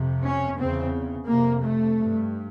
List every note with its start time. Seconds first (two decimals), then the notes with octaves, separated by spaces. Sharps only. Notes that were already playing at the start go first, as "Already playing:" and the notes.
Already playing: F2 C3
0.23 C#4
0.58 E2 C#3 C4
1.28 F2 C3 A#3
1.64 A3
1.99 G2